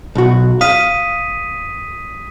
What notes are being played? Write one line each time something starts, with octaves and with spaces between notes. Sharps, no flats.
B1 F#4
F5 D#6 B6 D#7